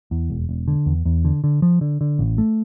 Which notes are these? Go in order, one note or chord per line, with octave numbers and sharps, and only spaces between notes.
E2
E1
E1
D3
E2
E2
D3
D3
F3
D3
D3
A1
A3